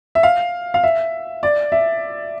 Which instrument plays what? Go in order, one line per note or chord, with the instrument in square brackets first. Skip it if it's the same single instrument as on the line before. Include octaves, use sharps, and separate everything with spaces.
[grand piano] E5
F5
F5
E5
D5
E5